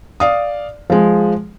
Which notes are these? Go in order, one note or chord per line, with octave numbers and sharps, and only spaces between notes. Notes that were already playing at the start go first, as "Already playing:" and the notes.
D5 F5 D#6
F3 G#3